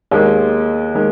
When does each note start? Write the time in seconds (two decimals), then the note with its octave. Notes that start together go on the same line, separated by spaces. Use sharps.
0.11 D#2 D#3 G#3
0.95 D#3 G#3